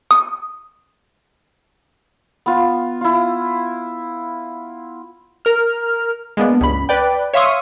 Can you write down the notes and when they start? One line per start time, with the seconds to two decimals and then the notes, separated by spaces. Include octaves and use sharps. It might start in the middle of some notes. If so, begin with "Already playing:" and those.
0.11 D#6
2.46 B3 F4
3.01 E4 F4
5.45 A#4 F6
6.37 G#3 A#3 B3 D4
6.61 C#2 G2 B5
6.89 B4 D5 G5
7.34 C#5 E5 F5 C6 C#6 D#6